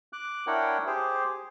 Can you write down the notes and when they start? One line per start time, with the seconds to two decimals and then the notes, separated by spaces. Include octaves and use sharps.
0.13 D6 F#6
0.47 D4 E4 A#4 C#5 F#5 G5
0.87 G4 G#4 C5